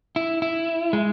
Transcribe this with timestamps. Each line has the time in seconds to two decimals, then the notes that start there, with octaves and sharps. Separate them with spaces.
0.16 E4
0.42 E4
0.93 G#3